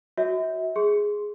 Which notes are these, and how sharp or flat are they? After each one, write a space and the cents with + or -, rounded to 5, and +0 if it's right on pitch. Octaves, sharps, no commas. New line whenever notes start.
F#4 +0 C#5 +40 E5 -35
G#4 +0 C6 +0